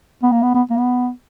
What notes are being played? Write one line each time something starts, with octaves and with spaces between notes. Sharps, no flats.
B3
A#3
B3
B3
A#3
B3